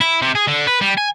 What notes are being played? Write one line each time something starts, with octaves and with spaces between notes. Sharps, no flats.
E4
C3
G#4
D3
B4
G3
G#5